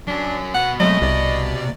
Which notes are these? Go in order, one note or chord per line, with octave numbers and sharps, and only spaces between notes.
F#3 C#4 D4
B2 F#5
F#3 G#3 A3 C4 D#5
C2 C3 D5